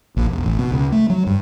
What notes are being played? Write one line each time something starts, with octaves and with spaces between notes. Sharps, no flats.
A#1
E1
A1
B2
C#2
A3
F#3
G2